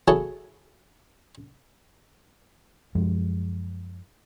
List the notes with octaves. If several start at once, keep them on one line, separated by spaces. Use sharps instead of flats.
E4 F#4 G#4 A4 C#5 A5
F#2 F3 G#3